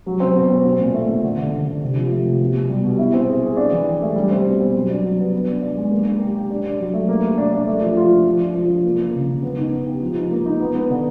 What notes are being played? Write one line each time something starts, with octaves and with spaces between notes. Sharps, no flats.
F#3
C4
B2
C4
C4
A#2
A3
A#2
D3
D3
D3
D3
C3
F3
A3
C3
B2
B2
G3
B2
E4
C4
G#4
G#4
D4
E3
G4
A3
G3
C4
B2
C4
F#3
D4
F#3
B3
B3
D4
D4
G#3
A#3
A#3
G4
G4
D4
D4
F#3
A3
A#3
A#3
D4
D4
A3
F3
F4
F3
F3
D4
F3
D4
A#3
A#3
C#3
C#3
B3
D#4
B3
G4
F3
D#4
A#3
D#4
B3
B3
D3